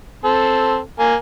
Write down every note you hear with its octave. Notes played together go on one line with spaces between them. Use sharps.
C4 A4
A#3 G#5